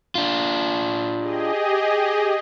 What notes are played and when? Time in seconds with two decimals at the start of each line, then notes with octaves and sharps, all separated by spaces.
0.15 D4 F4
1.18 G4 G#4 D#5